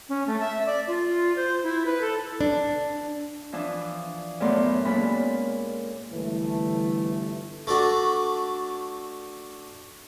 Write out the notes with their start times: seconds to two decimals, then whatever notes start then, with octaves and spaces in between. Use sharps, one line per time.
0.09 C#4
0.27 A3
0.41 E5
0.66 D5
0.87 F4
1.36 C5
1.63 E4
1.86 B4
2.01 A4
2.41 D4
3.52 E3 F3 D4 E4
4.40 F#2 A2 A3 B3 D5 C6
4.85 A#2 G#3 C#4 A4 B5
6.13 G1 E3 A3
7.67 A3 D4 F#4